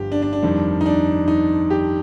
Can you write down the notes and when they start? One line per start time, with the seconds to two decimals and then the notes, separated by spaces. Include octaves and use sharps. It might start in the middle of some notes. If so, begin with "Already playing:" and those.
Already playing: G1 G2 F3 G4
0.12 D4
0.22 D4
0.33 D4
0.43 F2 D#3 G3
0.81 D#4
0.86 D4
1.28 D#4
1.70 G4